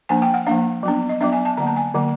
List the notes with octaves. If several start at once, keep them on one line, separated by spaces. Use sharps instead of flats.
F3 A#3 D4 G#5
G5
F#5
F3 A#3 D4 F5
F#3 B3 D4
D#5
F#3 B3 D4 E5
G#5
A5
D3 F#3 A#3 A#5
A5
G#5
D3 F#3 A#3